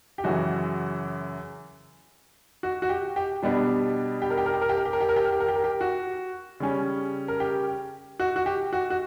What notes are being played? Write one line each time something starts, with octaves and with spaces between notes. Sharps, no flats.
G4
F#2 C#3 E3 F#4
F#4
F#4
G4
G4
B2 G3 B3 D4
G4
A#4
G4
A#4
G4
A#4
G4
A#4
G4
A#4
G4
A#4
G4
A#4
G4
A#4
G4
A#4
G4
F#4
C#3 G3 C#4
A#4
G4
F#4
F#4
G4
F#4
F#4